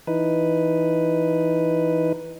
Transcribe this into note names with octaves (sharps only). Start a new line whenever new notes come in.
E3 D#4 B4